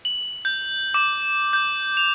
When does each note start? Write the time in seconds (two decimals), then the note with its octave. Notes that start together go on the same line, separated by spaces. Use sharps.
0.05 F#7
0.45 G6
0.94 D6
1.53 G6
1.97 F7